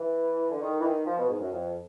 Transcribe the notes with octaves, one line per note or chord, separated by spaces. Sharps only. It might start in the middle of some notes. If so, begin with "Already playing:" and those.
Already playing: E3
D3
D#3
E3
D#3
F3
B2
G#2
F#2
F2